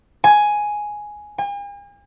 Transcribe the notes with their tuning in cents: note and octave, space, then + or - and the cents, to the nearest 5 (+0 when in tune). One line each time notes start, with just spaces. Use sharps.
G#5 +5
G#5 -45